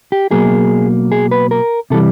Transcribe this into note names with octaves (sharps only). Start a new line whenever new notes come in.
G4
B2 F#3 A#3 G#4
G#4
B4
A#4
C3 E3 G3 A4